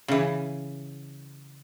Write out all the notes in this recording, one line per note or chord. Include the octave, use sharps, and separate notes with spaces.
C#3 E3